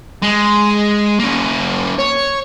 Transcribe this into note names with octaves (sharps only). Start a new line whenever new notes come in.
G#3
A#3 C#4
C#5